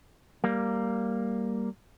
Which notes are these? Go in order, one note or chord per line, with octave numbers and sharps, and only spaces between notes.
G3 A#3